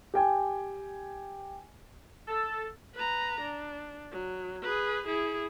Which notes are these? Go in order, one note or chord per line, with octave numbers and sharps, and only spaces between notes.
G4 G5 G#5
A4
B4 A#5
D4
F#3
G#4 B4
E4 G#4